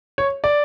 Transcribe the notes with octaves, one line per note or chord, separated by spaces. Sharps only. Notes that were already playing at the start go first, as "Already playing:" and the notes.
C#5
D5